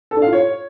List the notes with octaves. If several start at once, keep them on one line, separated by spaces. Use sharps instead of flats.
A4
D4
F5
F4
C#5